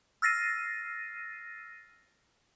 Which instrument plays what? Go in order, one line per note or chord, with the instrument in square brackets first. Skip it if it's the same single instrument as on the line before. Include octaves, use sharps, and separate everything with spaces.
[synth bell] E6 F6 A6 A#6 C7 D#7